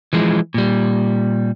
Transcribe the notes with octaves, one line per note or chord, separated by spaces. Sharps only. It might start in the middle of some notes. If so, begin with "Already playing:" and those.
E3 F3 G#3
A#2 G3